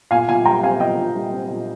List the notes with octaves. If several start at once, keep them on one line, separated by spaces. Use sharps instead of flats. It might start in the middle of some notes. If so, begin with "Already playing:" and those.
A#2 F5 G#5
A#2 F5 G#5
G3 G5 A#5
C4 F5 G#5
A#2 D#5 G5
A#2
G3
C4
A#2